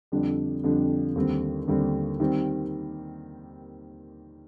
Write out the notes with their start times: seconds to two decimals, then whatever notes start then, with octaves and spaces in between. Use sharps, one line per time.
0.12 F2 D3 G3 D4
0.64 F2 D3 G3 D4
1.15 D#2 D3 G3 C4
1.67 D#2 D3 G3 C4
2.20 D#3 G3 C4 G4